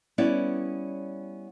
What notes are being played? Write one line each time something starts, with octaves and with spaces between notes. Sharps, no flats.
G3 B3 C#4 E4 C#5 D5